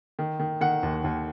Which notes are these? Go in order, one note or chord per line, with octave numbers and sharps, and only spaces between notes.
D#3
D#3
D#3 F#5
D#2
D#2